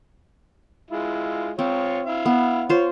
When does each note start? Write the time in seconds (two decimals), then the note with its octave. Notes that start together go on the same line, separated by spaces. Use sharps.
0.91 G#3 E4 F4
1.59 C4 F4 C#5
2.06 E4 F5
2.26 B3
2.69 F4 C5 C#5